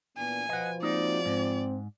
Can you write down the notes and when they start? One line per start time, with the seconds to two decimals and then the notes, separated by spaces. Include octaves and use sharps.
0.17 A#2 E3 B3 D4 G#5
0.49 B2 F3 F4 B4 D#5 F#5
0.83 G#3 A#3 C4 D#4 F#4 D5
1.26 G#2 C4